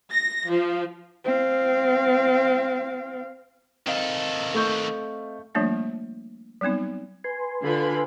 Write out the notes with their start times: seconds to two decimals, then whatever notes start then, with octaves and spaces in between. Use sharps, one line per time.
0.10 A#6
0.48 F3
1.25 C4 F5
3.87 D#3 C4 A4 D#5 F5
4.54 A3 C#6 G6
5.55 F3 G3 A3 A#3 D4 F4
6.61 F#3 G3 B3 C4 D#4
7.24 B4 G#5 C6
7.63 D3 F4 B5